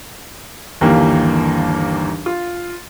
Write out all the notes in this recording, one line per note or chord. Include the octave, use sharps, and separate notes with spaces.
G1 D#2 E3 G3 A#3 G4
F4